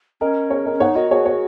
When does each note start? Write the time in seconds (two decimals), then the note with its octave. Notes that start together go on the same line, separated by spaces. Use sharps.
0.21 C#4 A#4 D#5
0.50 G#4 C#5
0.65 A#4 D#5
0.73 C#4
0.80 D#4 C#5 F#5
0.95 F#4 A#4 D#5
1.11 F#4 G#4 C#5
1.25 G#4 C#5